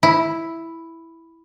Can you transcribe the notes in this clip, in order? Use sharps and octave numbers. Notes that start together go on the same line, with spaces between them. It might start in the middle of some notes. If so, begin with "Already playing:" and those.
E4